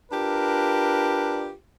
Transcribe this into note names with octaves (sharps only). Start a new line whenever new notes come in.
D4 F4 G4 A#4 B4